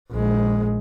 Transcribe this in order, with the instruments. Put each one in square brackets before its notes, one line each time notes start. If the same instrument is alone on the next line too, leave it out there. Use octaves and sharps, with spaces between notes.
[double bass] A#1 G#3